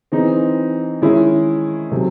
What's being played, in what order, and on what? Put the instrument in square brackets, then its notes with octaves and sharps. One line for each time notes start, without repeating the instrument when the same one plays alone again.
[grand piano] E3 C4 D#4 G#4
D#3 G#3 C#4 E4 G#4
C3 F#3 A3